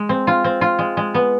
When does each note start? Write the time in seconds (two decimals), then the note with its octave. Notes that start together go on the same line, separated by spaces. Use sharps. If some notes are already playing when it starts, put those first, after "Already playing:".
Already playing: G#3
0.09 C4
0.27 F4
0.44 C4
0.61 F4
0.79 G#3
0.97 G#3
1.14 B3